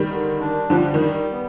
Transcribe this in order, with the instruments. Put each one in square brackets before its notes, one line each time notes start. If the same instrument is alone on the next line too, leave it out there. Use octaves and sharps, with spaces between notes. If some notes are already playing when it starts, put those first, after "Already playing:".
Already playing: [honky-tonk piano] D#3 G3
[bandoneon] D3
D4
[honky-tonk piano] D3 F3 [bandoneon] G3
[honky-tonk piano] D#3
[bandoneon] G3
B3